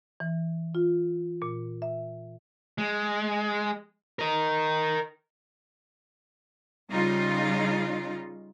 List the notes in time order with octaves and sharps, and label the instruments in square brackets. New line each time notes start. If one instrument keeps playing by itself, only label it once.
[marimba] E3
F4
A#2
E5
[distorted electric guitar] G#3
A#4 D#5
[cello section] C#3 G3 D#4 F4